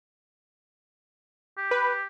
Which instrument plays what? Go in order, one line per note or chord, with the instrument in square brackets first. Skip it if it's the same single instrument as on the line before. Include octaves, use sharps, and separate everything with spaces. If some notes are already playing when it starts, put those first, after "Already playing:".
[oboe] G4
[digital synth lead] B4